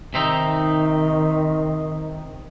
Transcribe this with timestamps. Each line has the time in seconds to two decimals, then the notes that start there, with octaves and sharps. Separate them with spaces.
0.14 C3 D#3 C4 D#4